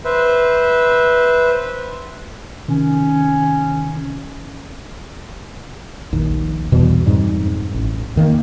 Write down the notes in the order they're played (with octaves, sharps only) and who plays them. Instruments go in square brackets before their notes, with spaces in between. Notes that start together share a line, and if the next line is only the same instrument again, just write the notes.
[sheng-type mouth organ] B4 C5 E5
[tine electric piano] C3 D#3 [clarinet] C#4
[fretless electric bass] A#1 D#2
E2 B2 E3 G3
F2 G#2 G3
A1
D#2 D#3 F#3 A#3